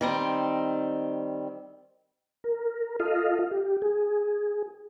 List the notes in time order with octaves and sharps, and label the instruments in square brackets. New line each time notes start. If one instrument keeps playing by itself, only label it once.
[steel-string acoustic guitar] D#3 G3 C4
[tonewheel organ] A#4
F4 A4 D#5 F5
G4
G#4